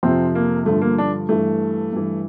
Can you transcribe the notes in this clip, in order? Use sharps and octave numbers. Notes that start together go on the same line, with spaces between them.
F2 C3 F3 C4
A#3
G2 D3 F3 A3
A#3
D4
G2 E3 A3
G2 E3